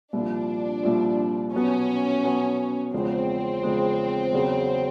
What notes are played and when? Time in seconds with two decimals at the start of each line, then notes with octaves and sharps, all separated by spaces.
0.13 C2 A#2 F3 D4
0.83 C2 A#2 F3
1.54 B2 F#3 B3 C#4
2.23 B2 F#3 B3
2.93 E2 C#3 F3 G#3 C4
3.63 E2 C#3 F3 G#3
4.33 E2 C#3 F#3